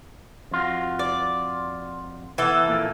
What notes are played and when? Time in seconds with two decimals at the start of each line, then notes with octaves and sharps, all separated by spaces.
0.51 F2 F4 F#4
0.99 D5
2.38 E3 B3 A4
2.67 F2 A#2 A#3